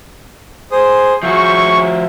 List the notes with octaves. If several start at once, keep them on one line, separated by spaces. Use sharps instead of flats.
G#4 C5 D#6
F3 C#4 F#4 G#4 E5 C#6